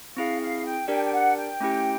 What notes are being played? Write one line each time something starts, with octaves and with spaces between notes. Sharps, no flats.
C4 E4 G#4 F5
F5
G5
D4 G4 A#4 D5 G5
G5
F#5
G5
A3 C#4 E4 G4